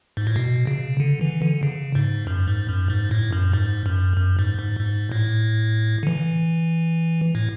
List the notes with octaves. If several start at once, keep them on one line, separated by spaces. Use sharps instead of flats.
G#2
A2
B2
C#3
D3
E3
D3
C#3
G#2
F#2
G#2
F#2
G#2
A2
F#2
G#2
F#2
F#2
G#2
G#2
G#2
A2
D3
E3
A2